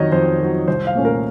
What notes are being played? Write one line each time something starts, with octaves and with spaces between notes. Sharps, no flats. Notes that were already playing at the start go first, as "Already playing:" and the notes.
Already playing: F2 D#3 F#3 C#5 D#5
F2 C5
D#3 F#3
C2 C5
F5
A#2 A3 C#4
A#4